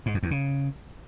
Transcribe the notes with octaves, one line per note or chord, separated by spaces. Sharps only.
G#2
F2
E2
C#3